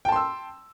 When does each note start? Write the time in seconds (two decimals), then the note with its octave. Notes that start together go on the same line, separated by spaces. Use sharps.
0.05 G5
0.09 A5
0.12 C6
0.16 E6